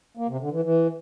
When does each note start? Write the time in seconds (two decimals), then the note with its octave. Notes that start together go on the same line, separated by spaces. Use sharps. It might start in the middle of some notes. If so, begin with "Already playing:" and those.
0.17 A#3
0.29 C3
0.40 D3
0.51 E3
0.63 E3